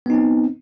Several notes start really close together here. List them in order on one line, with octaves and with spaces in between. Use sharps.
B3 D#4 C4